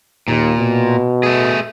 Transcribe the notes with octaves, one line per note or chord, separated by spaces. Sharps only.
D#2 A#2
B2
A3 G#4